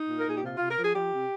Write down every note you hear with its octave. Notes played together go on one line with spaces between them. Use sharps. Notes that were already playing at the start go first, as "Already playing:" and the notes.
Already playing: D#4
A#2
A#4
A#2 G#4
G4
C3 F4
F4
C3
A#4
F3 G#4
F3 G4
C3